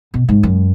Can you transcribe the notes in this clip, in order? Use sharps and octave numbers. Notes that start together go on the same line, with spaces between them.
B2
G#2
F#2